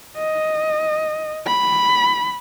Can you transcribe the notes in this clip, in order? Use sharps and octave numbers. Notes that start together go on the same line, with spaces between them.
D#5
B5